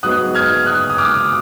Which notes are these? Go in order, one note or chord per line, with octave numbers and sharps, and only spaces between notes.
G#2 F#3 B3 D#4 D#6 F#6
F6 G#6
D#6 F#6
D#6
D6 F6